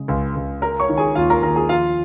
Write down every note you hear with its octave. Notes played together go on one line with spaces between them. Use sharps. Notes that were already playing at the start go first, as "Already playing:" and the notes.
Already playing: C#3 G#3
C#2
C#2
G#3 A#4 A#5
C#5 C#6
D#3
G#4 G#5
D#2 F4 F5
A#4 A#5
D#2 A#4 A#5
G#4 G#5
F3 F4 F5